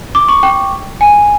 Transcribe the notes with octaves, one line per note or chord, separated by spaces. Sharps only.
D6
C#6
G5
G#5